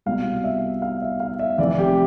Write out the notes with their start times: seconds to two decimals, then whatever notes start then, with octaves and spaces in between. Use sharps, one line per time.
0.06 C2 B2 F5
0.44 E5
0.82 F5
1.02 E5
1.20 F5
1.39 E5
1.58 F1 F2 E3 D5
1.78 G4